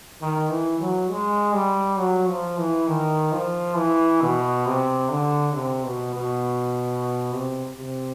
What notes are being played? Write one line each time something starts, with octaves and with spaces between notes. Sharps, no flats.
D#3
E3
F#3
G#3
G3
F#3
F3
E3
D#3
F3
E3
B2
C3
D3
C3
B2
B2
C3
C3